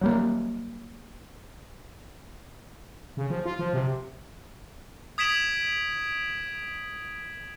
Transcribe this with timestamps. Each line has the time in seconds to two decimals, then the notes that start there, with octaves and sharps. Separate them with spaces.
0.01 F#3 G3 A#3
3.17 C#3
3.30 F3
3.46 F4
3.59 F3
3.73 C3
5.18 D#6 G#6 B6 D7 E7 F#7